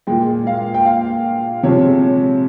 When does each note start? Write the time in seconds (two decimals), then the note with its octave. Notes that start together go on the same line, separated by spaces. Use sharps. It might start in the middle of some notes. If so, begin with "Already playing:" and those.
0.07 A#2 G#3 G5
0.47 F5
0.74 G5
0.85 F5
1.63 C3 F3 G#3 C#5